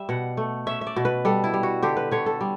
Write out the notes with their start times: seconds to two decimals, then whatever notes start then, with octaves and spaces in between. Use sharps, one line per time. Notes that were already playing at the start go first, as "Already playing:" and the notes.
Already playing: G3 E5
0.09 B2 F#5
0.37 A3
0.67 C#4 E5
0.81 E5
0.87 D5
0.96 B2
1.05 B4
1.25 G3 A4
1.44 E4
1.54 G3
1.63 F#4
1.83 D3 G4
1.97 B4
2.11 D3 C#5
2.26 A4
2.41 G3